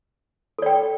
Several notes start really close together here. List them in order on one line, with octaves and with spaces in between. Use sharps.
A4 D5 G5